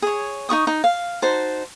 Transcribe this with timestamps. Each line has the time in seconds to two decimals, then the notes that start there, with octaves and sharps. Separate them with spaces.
0.02 G#4 C#5
0.49 D#4 F#4 C#6 D#6
0.67 D#4
0.84 F5
1.22 D#4 F#4 C5 A5